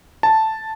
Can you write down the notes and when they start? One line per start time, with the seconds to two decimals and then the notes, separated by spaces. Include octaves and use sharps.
0.23 A5